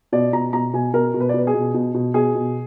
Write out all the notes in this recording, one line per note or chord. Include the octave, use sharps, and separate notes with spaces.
B2 D5
B2 A#5
B2 A#5
B2 G#5
B2 A#4
B2
B4
D5
B2 B4
G#4
B2
B2
B2
B2 G#4
B2